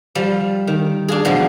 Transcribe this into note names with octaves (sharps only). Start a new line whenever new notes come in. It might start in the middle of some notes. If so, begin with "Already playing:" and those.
F3 G3
D#3
D4 F4 G#4
B2 F3 G#3 B3